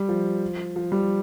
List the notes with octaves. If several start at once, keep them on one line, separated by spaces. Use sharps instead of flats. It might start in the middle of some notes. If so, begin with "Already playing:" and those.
Already playing: G3
F3
F3
G3